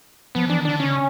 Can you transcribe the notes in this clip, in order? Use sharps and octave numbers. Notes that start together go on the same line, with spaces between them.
F3 B3
E3 D4
D#3
D3 D4
C#3 C#4